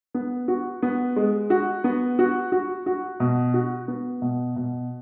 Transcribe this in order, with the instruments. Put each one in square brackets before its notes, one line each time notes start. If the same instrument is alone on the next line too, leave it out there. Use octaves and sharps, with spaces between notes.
[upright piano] B3
F#4
B3
G#3
F#4
B3
F#4
F#4
F#4
B2
F#4
B3
B2
B2